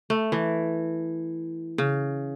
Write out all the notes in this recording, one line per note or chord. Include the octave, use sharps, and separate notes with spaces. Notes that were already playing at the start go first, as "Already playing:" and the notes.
A3
E3
C#3